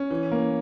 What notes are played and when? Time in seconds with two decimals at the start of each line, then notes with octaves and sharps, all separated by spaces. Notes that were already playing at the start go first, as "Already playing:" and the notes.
Already playing: C#4
0.11 E3
0.32 A#3